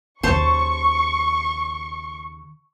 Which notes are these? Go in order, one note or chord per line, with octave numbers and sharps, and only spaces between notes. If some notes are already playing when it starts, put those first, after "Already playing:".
D#2 C#3 C5 A5 C#6